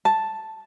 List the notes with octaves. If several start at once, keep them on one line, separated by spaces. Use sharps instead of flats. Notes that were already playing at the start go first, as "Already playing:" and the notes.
A5